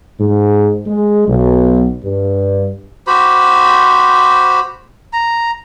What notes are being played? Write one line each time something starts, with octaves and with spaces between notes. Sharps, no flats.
G#2
G#3
B1
G2
F#4 G4 C5 B5
A#5